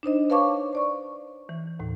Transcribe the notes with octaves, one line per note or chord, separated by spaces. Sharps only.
D4 D#4 C5 D#5
B4 C#5 F5 A5 C#6 D6
C5 D5 C#6
E3
D#2 A2